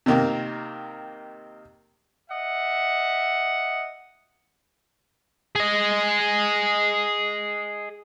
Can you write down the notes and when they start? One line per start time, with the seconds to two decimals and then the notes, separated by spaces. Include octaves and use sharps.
0.06 C3 D#3 A#3
2.30 D#5 E5 F#5
5.56 G#4 D#5